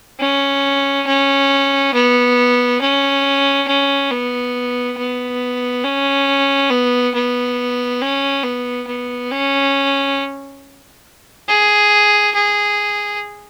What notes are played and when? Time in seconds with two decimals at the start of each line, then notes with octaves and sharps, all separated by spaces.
0.20 C#4
1.06 C#4
1.93 B3
2.80 C#4
3.67 C#4
4.11 B3
4.97 B3
5.84 C#4
6.70 B3
7.14 B3
8.01 C#4
8.43 B3
8.87 B3
9.31 C#4
11.48 G#4
12.35 G#4